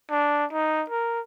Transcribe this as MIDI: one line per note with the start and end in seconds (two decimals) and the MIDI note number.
0.10 0.46 62
0.52 0.85 63
0.90 1.20 70